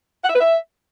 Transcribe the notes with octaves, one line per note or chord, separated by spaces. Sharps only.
F#5
E5
B4
E5